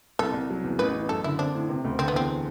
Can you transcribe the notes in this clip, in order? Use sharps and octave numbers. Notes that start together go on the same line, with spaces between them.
C2 A4
C2
F#3
E2
A1 B4
E3
F#2 A4
D3 E4
C4 D4
A2
C3
D2
D3 C4
B3
E2 C4